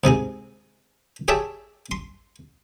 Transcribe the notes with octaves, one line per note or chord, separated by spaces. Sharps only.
G#2 C3 D#4 G#4
G4 G#4 C#5 E5 G5 A5
C6